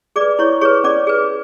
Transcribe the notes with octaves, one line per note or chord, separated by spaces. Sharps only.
G#4 D5 D6
B4
E4 C#5 C#6
G#4 B4 C#5 C#6
C#4 D5 D6
G#4 B4